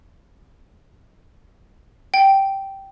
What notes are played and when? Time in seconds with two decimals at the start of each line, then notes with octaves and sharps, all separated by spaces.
2.14 G5